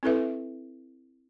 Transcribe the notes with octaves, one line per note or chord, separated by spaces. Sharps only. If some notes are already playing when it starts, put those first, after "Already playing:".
C4 E4 A4 B4 E5